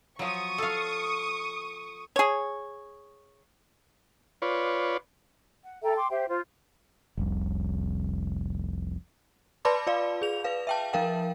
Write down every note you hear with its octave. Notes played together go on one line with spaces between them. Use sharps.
F3 F#3 C#6 D#6
A4 F5
G#4 C#5
F4 B4 C#5 D5
F#5
A4 E5 G5 A#5
G5 C6 D6
G4 C5 E5 G5
F4 C5
F1 C2
B4 D5 A5 B5 C6 D6
F4 D5 F5
G#4 F7
B4 F5
E5 G5 A5
F3 A#4 F5 G5